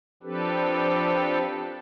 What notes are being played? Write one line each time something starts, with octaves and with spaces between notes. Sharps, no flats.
F3 C4 D4 G4 A4 B4